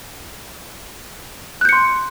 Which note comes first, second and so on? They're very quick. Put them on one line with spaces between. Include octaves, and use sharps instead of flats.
F#6 G6 C#7 C6